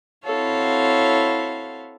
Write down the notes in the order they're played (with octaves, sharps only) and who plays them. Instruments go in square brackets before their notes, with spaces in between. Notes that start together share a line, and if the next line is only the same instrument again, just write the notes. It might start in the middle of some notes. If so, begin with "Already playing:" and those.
[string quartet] C4 E4 F#4 A4 C#5 F5